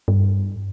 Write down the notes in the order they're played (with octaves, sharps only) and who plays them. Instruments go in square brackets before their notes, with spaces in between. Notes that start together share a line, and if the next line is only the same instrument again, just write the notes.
[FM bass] G2